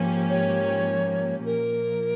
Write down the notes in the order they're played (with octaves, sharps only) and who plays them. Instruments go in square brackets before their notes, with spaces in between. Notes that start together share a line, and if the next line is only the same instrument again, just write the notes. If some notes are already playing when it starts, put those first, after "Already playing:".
Already playing: [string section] G#2 F3 A#3 C#4 G4
[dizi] C#5
[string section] A#2 F3 A#3 [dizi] A#4